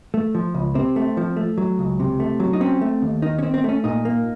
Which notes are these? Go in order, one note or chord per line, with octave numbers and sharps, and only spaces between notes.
A3
F3
C#2
C3 C4
A3
F3
A3
F#3
C#2
C3
A3
F#3
D#4
C4 C#4
A3
D#2
D#3 D#4
C#4
C4
C4
A3 C#4
A#2 D#4
A#3